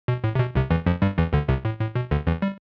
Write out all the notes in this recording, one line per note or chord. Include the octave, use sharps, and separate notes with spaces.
B2
A2
C3
B2
C2 C3
E2 E3
F2 F3
G2 G3
E2 E3
D2 D3
C2 C3
A2
A2
B2
D2 D3
E2 E3
G3